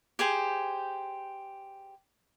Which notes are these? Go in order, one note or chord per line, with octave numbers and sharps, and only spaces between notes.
G4 G#4 C5